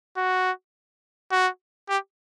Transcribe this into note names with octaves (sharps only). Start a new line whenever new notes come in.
F#4
F#4
G4